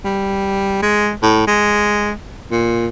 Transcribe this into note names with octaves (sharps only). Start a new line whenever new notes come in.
G3
G#3
A2
G#3
A#2